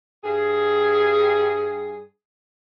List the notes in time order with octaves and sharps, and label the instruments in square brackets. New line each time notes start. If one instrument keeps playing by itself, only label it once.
[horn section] G2 G#4